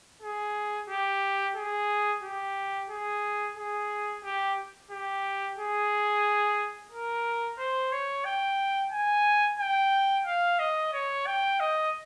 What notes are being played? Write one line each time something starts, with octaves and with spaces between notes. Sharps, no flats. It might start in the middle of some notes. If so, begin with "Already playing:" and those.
G#4
G4
G#4
G4
G#4
G#4
G4
G4
G#4
A#4
C5
C#5
G5
G#5
G5
F5
D#5
C#5
G5
D#5